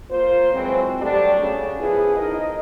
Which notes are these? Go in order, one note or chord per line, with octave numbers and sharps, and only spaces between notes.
A#3 F4 C5
E3 F#3 G#3 C4
F#3 G3 A3 D4 G4
C#3
F3 B3 E4 G#4
D#4 A#4 D#5